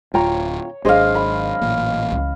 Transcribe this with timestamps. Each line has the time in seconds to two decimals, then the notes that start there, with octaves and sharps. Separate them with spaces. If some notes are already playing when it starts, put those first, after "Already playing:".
0.14 D1 F4 C#5 G5 A#5
0.85 G#1 F#3 D4 G#4 C5 D#5 F5
1.15 B5
1.61 A1 A#2
2.12 C#2 E3